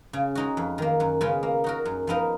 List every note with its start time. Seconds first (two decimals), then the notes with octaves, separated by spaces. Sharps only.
0.13 C#3
0.35 G#3 D#4 F#4
0.57 F2
0.78 D#3 A#3
1.00 F#2
1.21 C#3 G#3 B3 F4
1.43 A#3
1.64 D#4 F#4 A#4
1.85 F#2
2.07 F3 B3 D#4 A#4